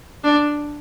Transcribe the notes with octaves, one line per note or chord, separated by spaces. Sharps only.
D4